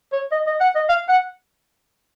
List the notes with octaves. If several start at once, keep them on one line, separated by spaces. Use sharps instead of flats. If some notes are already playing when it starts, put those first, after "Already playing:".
C#5
D#5
D#5
F#5
D#5
F5
F#5